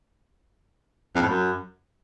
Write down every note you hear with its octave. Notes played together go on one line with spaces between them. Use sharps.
F2
A2
F#2